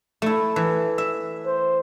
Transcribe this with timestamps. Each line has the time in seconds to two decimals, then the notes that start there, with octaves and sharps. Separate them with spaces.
0.22 A3 E4
0.56 E3
0.98 E5
1.46 C5